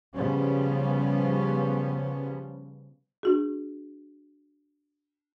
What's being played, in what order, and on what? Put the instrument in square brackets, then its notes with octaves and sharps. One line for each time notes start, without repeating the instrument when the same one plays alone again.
[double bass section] C#3 F3 G3 B3 C#4
[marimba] D4 F#4 G#4